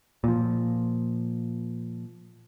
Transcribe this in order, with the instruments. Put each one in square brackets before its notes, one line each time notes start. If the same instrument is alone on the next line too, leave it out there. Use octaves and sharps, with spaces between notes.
[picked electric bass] A#2 F3